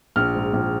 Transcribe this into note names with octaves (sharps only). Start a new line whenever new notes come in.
A#1 F6
G#2
A#1